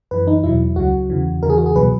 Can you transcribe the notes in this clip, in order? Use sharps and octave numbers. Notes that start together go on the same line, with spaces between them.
F#2 E3 B4
D#4
E2 B2 F#3 E4
C#2 C#3 F#3 F#4
E2 C#3 E3
E2 C#3 E3 A#4
G#4
F#4
G#4
C#2 B2 F#3 B4